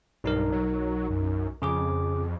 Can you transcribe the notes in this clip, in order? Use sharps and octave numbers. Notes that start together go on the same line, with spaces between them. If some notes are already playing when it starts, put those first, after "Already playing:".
B1 G2 D#4 A#4
F#3
F#2
F2 C#3 G#4 D6